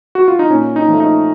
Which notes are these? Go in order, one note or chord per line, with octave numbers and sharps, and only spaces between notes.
F#4
F4
D#4
A#2 C#4
D#4
F3 A3
D#4